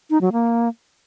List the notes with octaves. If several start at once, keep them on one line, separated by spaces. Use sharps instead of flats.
D#4
F#3
A#3